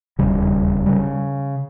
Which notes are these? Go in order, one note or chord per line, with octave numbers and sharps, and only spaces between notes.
E1 D#2 C#3 G3
C#3 G3